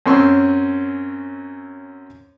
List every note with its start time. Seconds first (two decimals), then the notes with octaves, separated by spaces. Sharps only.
0.06 F#2 C4 C#4 C6 C#6 E6